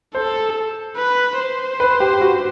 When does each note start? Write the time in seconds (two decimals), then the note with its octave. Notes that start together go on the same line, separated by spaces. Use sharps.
0.15 A4 C5
0.97 B4
1.38 C5
1.80 B4
2.00 G4
2.21 F#4